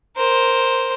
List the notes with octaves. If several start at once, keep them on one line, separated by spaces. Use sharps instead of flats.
A#4 C5